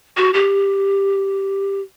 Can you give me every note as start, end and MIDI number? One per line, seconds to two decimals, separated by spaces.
0.17 0.31 66
0.34 1.81 67